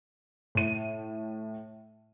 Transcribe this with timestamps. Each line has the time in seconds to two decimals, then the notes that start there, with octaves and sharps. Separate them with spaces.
0.55 A2 D#7